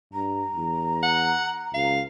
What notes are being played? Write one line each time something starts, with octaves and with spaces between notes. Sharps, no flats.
G2 A#5
E2
F#5
C#2 F5